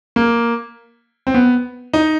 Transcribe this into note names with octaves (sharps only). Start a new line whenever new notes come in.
A#3
C4
B3
D#4